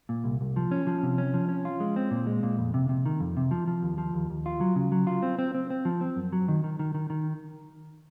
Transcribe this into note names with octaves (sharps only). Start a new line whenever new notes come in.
A#2
C2
C2
F3
C#4
F3
C3
C#4
F3
C#4
F4
G#3
C4
A#2
G#3
A#2
F2
C3
C3
D#3
F2
C3
F3
F3
D#2
F3
D#2
D#2
F4
F#3
C#3
F#3
F4
C4
C4
C4
C4
F3
C4
F#2
F#3
D#3
D#3
D#3
D#3
D#3